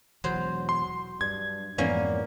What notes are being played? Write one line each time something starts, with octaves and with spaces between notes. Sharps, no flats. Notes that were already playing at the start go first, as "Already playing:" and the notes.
E1 E2 F#3 C5
C6
G2 D4 G#6
F2 G#2 E3 A#3 B3 C#4 D5